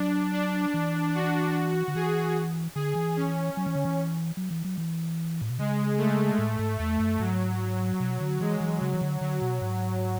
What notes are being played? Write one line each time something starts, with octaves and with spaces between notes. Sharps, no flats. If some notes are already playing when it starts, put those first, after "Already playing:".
Already playing: F#3 D4
D4
E3
F#4
D3
E3 G#4
D3 G#4
E3
C#4
F#3
E3
D3
E3
F#3
E3
F#3
E3
A2
B2
C#3 G#3
A3
A2
G#2
E2 A3
F#2
G#2 F#3
B2 F#3
D3
E3 G#3
E3
C#3 F#3
E3
D3
D3 F#3
B2
G#2